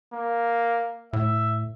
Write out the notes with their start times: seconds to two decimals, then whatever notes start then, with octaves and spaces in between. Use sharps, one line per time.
0.14 A#3
1.13 A2 E5